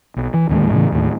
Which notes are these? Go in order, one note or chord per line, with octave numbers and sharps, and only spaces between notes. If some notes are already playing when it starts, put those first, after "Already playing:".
B1
E3
D1 D#2 D3 G#3
A2 C#3 E3
D#2 A2